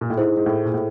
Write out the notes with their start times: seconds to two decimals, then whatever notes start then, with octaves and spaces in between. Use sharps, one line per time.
0.01 A#2
0.10 A2
0.18 G#2 E4 G#4 C5
0.37 G#2
0.46 A2
0.65 A#2
0.74 A2